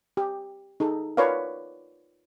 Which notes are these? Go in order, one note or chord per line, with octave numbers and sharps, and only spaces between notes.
G4
D#4 G#4 A4
F4 A#4 B4 C#5 D5 F5